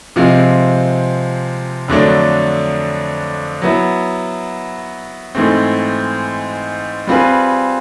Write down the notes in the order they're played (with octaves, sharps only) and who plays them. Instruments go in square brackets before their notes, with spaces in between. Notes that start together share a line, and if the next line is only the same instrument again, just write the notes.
[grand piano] C3 F3 G#3 C4
F2 D3 F#3 A3 D4
F#3 B3 E4
G#2 E3 A3 C4
G3 C4 F4 G#4 B4